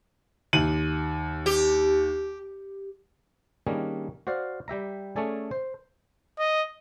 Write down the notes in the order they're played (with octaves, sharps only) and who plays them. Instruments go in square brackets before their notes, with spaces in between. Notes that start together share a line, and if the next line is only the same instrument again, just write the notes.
[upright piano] D#2 D#7 F#7
[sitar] G4
[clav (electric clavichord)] D#3 G3 A#3 C#4 D4 G#4
F#4 C5 D5 F5
G3 G4 E5 A#5
A3 C#4 G#4 A4 D5 G#5
C5
[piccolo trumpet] D#5